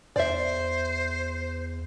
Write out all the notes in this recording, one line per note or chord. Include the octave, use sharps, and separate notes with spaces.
E2 C5 D5 E5